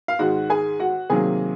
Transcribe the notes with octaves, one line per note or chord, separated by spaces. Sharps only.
F5
G#2 D#3 G#3 F#4 F#5
G#4 G#5
F#4 F#5
C3 D#3 F#3 A#3 G#4 G#5